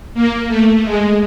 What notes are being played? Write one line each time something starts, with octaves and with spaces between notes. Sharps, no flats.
A#3
A3
G#3